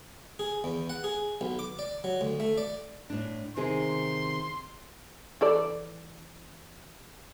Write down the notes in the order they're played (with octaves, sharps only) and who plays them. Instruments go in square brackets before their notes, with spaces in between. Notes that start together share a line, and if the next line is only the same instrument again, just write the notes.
[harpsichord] G#4
E2
F#5
G#4
B1
D6
D5
F#3
D2
A3
D5
[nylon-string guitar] A2 D4
[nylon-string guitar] C3 D#3 G#4 [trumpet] C6
[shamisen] E3 A4 D5